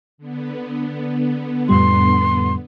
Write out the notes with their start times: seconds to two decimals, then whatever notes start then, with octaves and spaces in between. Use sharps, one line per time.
0.18 D3 B3
1.69 F2 A2 G3 C6